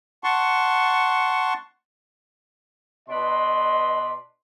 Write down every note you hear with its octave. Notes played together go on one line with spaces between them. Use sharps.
F#5 A5 C6 C#6
B2 D4 B4 D#5 C6